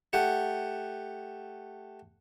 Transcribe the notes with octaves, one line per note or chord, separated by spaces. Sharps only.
A3 G4 F#5